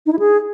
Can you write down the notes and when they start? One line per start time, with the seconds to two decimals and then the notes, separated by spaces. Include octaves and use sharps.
0.06 D#4
0.13 E4
0.19 G#4